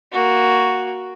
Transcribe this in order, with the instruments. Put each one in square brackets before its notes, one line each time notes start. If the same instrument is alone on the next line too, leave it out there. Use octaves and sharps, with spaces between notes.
[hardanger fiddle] A#3 F#4